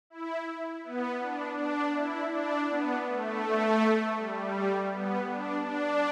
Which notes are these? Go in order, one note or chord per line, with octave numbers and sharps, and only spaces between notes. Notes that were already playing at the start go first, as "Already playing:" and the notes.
E4
B3
D4
D4
E4
D4
B3
A3
G3
B3
D4
D4